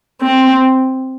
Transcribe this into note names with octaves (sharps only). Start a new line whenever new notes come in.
C4